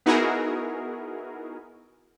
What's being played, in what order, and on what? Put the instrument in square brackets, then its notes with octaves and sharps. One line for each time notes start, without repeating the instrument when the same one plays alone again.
[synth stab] B3 D#4 E4 F#4 G#4 A#4